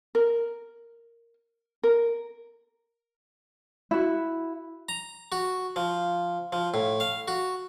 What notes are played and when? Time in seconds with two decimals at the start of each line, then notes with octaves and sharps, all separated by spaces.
0.15 A#4
1.83 A#4
3.91 E4 F#4
4.89 A#5
5.32 F#4
5.76 F3
6.53 F3
6.74 A2
7.00 F5
7.28 F#4